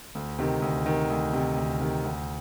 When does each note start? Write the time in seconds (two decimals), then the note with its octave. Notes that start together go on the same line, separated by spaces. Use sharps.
0.15 D2
0.39 C3 D#3
0.62 D2
0.86 C3 D#3
1.10 D2
1.33 C3 D#3
1.57 D2
1.80 C3 D#3
2.04 D2